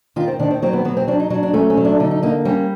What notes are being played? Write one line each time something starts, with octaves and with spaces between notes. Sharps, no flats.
D#3 F4
C4
D#3 D4
C4
F#3 C4
B3
F#3 B3
C4
F#3 D4
D#4
F#3 D4
D4
A3 C#4
C#4
F#3
D4
D3 D#4
D#4
A#3 D#4
G3 C#4